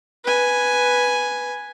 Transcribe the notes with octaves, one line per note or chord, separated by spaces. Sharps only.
B4 G#5